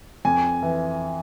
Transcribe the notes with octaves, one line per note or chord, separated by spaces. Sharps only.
F2 G#5
E3